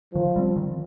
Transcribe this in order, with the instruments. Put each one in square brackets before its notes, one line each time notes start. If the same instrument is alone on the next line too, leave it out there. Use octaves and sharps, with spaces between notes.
[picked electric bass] D#3 [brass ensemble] F3
[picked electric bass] G3 C4
D#3